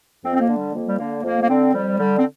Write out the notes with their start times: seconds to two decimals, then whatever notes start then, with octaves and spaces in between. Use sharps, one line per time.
0.24 F2 C4
0.34 C4
0.41 A#3
0.48 D3
0.57 G3
0.73 F2 A#3
0.87 G3
0.99 D3 A#3
1.23 F2 A#3
1.43 A#3
1.49 D3 C4
1.73 F2 G3
1.98 D3 G3
2.18 C4